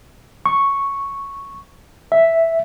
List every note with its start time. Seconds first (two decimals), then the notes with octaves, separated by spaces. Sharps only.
0.46 C#6
2.12 E5